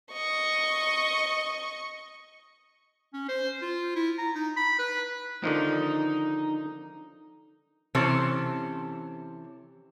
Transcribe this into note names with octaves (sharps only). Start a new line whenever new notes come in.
D#5 C#6
C#4
C5
F4
E4
A#5
D#4
B5
B4
D3 D#3 F3 D#4
C3 E3 C#4 A4 C5